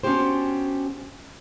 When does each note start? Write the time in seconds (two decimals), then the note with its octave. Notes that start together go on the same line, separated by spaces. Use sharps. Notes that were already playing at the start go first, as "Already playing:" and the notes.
0.03 B3 C#4 D4 F#4 G4 C5